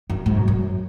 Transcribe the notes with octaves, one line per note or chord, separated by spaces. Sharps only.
F#2
G#2
F#2
F#2